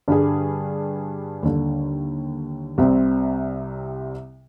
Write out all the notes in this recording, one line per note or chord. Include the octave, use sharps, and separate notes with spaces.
G2 D3 G3 D4 G#4
D#2 D3 G3
C2 C3 G3 C4